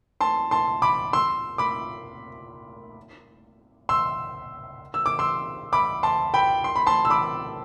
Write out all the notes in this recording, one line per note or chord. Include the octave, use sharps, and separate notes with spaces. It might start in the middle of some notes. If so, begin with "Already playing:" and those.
A5 C6
A5 C6
B5 D6
C6 E6
B5 D6
C6 E6
E6
D6
C6 E6
B5 D6
A5 C6
G5 B5
C6
B5
A5 C6
E6
B5 D6